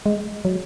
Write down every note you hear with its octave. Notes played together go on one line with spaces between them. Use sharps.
G#3
F#3